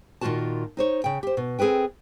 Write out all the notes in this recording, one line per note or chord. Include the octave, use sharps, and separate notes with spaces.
A#2 D#3 F3 F4 F#4 A5
D#4 C5 C#5
C#3 G5
G4 C5
B2
C4 G#4 A4 B4 G5